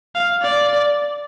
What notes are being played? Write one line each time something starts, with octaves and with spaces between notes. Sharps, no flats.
F5
D5